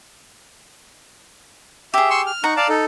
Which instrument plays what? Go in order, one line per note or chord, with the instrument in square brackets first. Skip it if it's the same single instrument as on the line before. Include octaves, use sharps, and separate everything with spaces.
[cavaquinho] G4 G#4 [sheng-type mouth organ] E5
[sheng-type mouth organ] C6 C#6 E6
F6
[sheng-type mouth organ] D#4 C#6 [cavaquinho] F#5 A#5
[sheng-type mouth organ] D5 F5 A5
D#4 A4